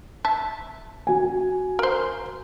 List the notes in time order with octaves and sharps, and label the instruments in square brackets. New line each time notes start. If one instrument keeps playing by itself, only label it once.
[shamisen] E5 A5
[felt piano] F#4 G#5
[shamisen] A#4 C5